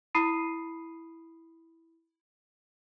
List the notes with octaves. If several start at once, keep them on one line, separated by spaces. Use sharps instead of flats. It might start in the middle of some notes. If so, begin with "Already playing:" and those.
E4 B5 D#6 C7 D#7